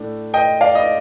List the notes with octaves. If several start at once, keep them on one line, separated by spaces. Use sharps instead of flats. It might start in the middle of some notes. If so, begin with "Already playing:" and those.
Already playing: A2 A3 D4
D#5 G5
D5 F5
D#5